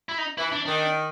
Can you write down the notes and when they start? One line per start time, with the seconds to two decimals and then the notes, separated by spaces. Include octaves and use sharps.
0.09 E4
0.18 D#4
0.38 E3 E4
0.52 D4
0.65 D#3 D4